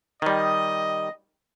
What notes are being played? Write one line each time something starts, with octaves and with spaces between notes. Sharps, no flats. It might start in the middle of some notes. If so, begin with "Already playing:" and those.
D#3 G3 D#5